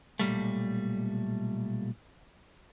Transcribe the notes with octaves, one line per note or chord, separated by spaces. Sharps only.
B1 A#2 G3 A3